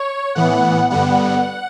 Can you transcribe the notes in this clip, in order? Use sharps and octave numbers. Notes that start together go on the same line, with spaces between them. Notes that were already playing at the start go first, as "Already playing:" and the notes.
Already playing: C#5
A2 E3 B3 F#5
G2 D3 G3 B3 F#5